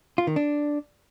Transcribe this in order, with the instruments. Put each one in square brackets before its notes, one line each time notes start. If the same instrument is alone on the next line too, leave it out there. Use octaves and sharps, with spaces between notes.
[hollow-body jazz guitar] F4
D#3
D4